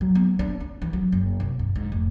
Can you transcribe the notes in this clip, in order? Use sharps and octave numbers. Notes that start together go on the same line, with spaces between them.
F#3
B3
D4
C#4
E3
F#3
F#1
C3
G2
G#2
F1